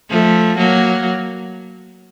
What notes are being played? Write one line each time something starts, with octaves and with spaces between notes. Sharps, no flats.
F3 A3
F#3 A#3